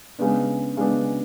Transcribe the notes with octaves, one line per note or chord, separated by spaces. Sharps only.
C#3 G#3 B3 D4
C#3 G#3 B3 D4